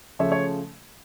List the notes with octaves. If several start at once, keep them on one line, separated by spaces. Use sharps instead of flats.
C#3 F3 A3 C#5 E5
C#5